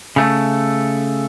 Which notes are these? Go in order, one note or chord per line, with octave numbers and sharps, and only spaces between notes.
C#3 A3